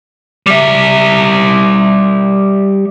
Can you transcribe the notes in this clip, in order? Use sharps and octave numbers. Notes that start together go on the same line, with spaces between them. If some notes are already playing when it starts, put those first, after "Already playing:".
G3 E5